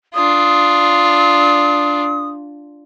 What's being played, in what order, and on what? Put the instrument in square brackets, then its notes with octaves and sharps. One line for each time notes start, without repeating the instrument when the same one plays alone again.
[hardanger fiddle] D4 F4 [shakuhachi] D#6